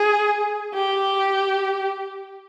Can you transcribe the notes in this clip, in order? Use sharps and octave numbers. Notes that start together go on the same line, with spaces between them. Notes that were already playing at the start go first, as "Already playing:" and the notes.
Already playing: G#4
G4